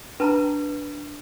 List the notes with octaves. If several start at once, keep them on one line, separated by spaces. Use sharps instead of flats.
D4 B4 A5 A#5